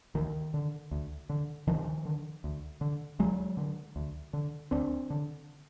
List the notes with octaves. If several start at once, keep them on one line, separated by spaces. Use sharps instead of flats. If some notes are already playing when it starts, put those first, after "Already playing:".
D2 D#3
D3
D2
D3
D2 D#3 F3
D3
D2
D3
D2 F#3 G#3
D3
D2
D3
D2 C4 D4
D3